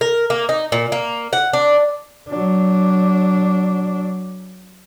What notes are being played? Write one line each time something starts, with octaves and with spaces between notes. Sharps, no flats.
A#4
A#3
D#4
A#2
A#3
F#5
D4
F#3 D4